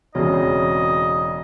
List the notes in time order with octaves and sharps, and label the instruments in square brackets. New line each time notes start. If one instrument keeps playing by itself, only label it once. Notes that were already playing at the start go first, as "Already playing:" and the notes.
[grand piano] E1 C#3 [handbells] C4 F#4 C#5 [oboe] D#5